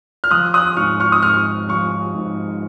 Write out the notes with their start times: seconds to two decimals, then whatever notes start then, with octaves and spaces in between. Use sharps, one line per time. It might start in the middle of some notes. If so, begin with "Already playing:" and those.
0.24 F6
0.31 F3 D#6 F#6
0.54 D#6 F#6
0.77 G#2 C#6 F6
1.00 C#6 F6
1.12 D#6
1.23 G#2 C#6 F6
1.69 F3 C#6 F6
2.15 G#2